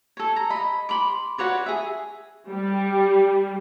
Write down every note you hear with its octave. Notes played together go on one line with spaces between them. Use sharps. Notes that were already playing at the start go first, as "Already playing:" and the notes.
A4 C#5
A#5
D#5 B5
B5 C6 D6
F#4 B4 C#5 D5
G#4 E5
G3